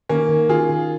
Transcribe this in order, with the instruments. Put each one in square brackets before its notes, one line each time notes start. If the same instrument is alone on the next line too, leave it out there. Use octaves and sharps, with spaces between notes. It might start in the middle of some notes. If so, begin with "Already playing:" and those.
[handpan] D#3 [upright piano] A#3 C#4
[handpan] D#3
[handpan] D#3 [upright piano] F4 G#4
[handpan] D#3